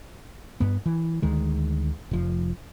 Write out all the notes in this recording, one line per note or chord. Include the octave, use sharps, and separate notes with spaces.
G2 B3
E3
D2 D#3 G#3
F1 F3